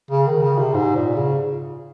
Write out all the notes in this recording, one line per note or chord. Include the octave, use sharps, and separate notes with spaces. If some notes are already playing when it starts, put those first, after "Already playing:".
C#3
D#3
C#3
C3
G#2
A#2
C#3